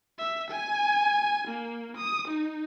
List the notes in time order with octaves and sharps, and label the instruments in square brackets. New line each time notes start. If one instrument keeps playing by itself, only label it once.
[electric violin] E5
G#5
A#3
D#6
D#4